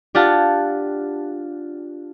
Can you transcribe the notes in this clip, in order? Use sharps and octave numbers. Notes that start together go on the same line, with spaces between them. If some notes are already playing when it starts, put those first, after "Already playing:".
D4 F4 G4 F5 F#5 A5